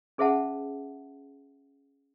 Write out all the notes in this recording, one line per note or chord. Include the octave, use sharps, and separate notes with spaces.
C#4 G#4 C5 E5 F#5 A5